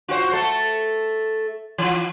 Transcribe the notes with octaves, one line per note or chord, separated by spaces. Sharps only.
F4 F#4 C5
A3 A4
E3 F4